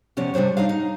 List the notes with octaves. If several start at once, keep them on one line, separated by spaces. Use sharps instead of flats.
F2 C3 B3 C#4 D4
C3 G3 D4 C5 C#5
D4 D#4 D#5 F5
D#4